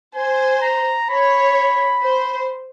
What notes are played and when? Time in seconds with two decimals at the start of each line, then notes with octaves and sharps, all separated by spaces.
0.15 C5 G#5
0.62 A#5
1.10 C#5 B5
2.03 C5